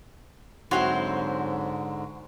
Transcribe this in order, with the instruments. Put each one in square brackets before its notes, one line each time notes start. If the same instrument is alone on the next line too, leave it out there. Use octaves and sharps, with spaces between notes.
[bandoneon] G#2 D3 [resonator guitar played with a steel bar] F#3 C4 E4 [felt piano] F#4 C6